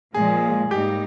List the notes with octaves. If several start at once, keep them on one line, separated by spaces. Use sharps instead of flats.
A#2 F3 G#3 G#4
G#2 G3 A#3 D#4 G4